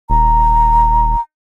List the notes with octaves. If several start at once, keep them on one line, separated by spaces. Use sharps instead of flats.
D#1 A#5